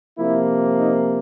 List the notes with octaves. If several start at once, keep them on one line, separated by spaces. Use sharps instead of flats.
C3 F3 A#3 E4
D#4